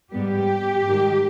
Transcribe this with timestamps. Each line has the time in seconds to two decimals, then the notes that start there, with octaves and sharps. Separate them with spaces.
0.12 G#2 G3 B3 G4
0.85 G#2 D#3 G3